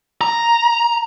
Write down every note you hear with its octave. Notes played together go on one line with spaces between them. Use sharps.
A#5